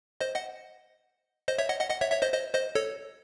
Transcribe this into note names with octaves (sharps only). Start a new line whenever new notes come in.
C5 D#5
D#5 F#5
C5 D#5
C#5 E5
D#5 F#5
D#5 F#5
D#5 F#5
C#5 E5
C#5 E5
C5 D#5
C5 D#5
C5 D#5
A4 C#5